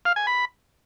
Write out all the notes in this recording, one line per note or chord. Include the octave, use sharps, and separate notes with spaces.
F5
G#5
B5